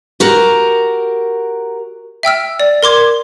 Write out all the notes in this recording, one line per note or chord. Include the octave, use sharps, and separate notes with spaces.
F#4 G4 A#4
E5 G5 E6 F6
D5
A#4 C6 D6 G#6